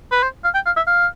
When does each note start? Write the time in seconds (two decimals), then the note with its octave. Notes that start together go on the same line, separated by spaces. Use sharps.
0.12 B4
0.23 C5
0.44 F5
0.55 G5
0.66 F5
0.77 E5
0.87 F5